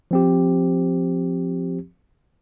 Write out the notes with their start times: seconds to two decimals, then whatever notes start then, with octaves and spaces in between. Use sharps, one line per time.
0.11 F3 C4 G4